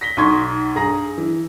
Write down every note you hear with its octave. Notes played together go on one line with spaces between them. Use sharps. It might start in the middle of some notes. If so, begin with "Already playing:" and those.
A#6 B6 G7
B1 D#4 C6 C#6 G#6
G2 G#4 A#5 A#6
E3